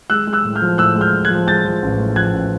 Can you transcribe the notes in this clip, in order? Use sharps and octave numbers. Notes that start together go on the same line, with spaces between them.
G#3 E6 F#6
G#3
E6 F#6
A2
F6 G6
F3
A2 E6 F#6
G#3
F6 G6
A2
F#6 G#6
F3
G#3 G6 A6
F3
A1
A2
F3 F#6 G#6
A1